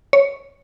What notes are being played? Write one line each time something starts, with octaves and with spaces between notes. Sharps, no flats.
C#5